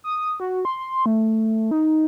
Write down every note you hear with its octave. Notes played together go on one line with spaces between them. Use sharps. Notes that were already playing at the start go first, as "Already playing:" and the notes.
D#6
F#4
C6
A3
D#4